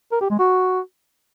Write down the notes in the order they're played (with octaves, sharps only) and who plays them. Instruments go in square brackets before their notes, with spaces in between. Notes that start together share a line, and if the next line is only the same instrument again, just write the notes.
[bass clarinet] A#4
G4
G#3
F#4